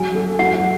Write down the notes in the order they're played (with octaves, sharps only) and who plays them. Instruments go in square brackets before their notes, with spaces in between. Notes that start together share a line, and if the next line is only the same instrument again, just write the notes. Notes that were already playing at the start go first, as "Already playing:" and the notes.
Already playing: [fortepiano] F#3 G#4 [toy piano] G#5
[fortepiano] A4
[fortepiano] F#3 [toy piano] F#5